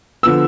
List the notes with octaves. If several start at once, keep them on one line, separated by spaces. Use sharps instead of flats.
D3 F3 B3 E6